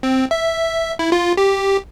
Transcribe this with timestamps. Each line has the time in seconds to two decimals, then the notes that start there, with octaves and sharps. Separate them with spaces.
0.03 C4
0.31 E5
0.99 E4
1.12 F4
1.37 G4